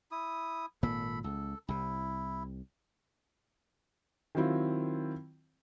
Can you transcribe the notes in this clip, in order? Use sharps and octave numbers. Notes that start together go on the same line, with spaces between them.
E4 D#6
G#1 A#2 A#3 A4 B5
C#2 A4
C2 C3 E4
D#3 F#3 C4 E4 F4